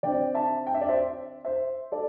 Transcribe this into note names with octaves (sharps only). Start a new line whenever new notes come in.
D3 C4 D5 G5
E5 A5
G5
E5
D5
C5 E5
C5 E5
A4 D5